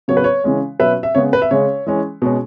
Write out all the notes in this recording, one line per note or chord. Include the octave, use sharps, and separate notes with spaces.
C#3 F#3 B3 C#5
B4
C#5
C#3 E3 G#3 C#4
B2 F#3 C#4 B4 E5
E5
C#3 G#3 B3 C#5
B4
E5
C#3 G#3 C#4 C#5
E3 G#3 C#4
B2 G#3 C#4